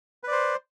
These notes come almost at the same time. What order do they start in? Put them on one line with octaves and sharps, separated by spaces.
B4 D5 C5